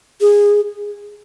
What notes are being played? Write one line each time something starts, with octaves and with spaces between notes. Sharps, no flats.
G#4